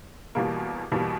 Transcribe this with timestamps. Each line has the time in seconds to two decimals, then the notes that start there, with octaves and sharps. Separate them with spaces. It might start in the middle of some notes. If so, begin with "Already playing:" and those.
0.35 E2 B2 G3 A#3
0.92 E2 B2 G3 A#3